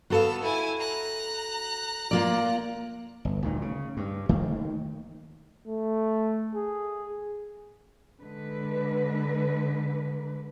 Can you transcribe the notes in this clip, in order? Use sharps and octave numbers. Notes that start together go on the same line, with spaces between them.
B3 F#4 A4 F5 E6
E4 G#5
A#5 F#6
A#3 F4 D5
G1
D2 A#2 D#3
C#3
G2
D#3 A3 A#3
A3
G#4
D3 G#3 B4